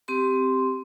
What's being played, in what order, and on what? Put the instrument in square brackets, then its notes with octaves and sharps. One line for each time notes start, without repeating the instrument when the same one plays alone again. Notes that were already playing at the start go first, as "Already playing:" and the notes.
[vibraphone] C4 G4 C6